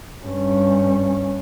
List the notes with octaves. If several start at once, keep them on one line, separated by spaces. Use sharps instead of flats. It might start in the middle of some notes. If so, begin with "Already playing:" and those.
G2 C#4